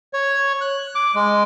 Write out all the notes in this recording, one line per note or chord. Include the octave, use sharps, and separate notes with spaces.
C#5
F#6
D6
G#3